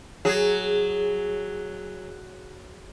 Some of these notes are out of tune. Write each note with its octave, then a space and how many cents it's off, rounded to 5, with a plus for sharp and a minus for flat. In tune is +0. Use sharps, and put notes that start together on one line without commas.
F#3 +0 G#4 -10